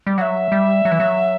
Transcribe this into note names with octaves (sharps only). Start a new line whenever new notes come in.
G3
F#3 E5 F#5
G3
F#3
E3
F#3